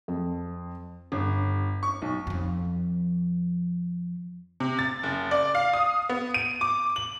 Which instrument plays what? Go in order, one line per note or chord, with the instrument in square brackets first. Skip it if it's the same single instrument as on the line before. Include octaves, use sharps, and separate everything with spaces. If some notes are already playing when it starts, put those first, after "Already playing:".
[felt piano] F2
[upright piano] G1
C#6
B1
[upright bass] F2 F3
[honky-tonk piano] C3
A6
F#1
D5
F5
D#6
B3
D#7
D6
F#7